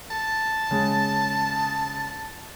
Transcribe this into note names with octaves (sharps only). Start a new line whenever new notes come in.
A5
C#3 G#3